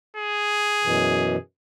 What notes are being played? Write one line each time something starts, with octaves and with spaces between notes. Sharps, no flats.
G#4
F#2 B2 E3